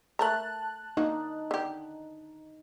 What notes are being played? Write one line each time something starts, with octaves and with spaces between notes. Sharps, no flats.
A3 A#4 A5 A#5 F#6
A#3 D4 D#4 F#4
D3 G4